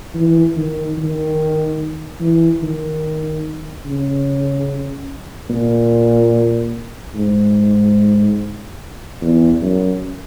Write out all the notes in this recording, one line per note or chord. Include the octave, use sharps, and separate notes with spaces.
E3
D#3
D#3
E3
D#3
C#3
A#2
G#2
E2
F#2